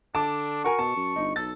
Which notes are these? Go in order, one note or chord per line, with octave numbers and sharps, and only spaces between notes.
D3 D4 A5 D6
F#4 A#4 G#5 C#6
B2 A5
F#2
G1 D#4
B1 A4 A6